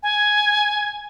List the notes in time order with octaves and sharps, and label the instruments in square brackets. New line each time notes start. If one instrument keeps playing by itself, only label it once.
[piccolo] G#5